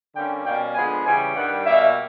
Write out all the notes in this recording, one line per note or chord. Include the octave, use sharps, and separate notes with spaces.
D3 G3 A#3 C#4 G5
B2 G3 A#3 C#4 G5
D3 F3 G#3 B3 G#5
C#3 E3 G3 G#5
G2 D#3 G3 F#5
B2 G3 A#3 E5